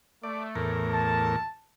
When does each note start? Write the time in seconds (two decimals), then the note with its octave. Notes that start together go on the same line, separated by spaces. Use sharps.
0.23 A3 D5
0.55 E2 A2 A#4
0.89 A5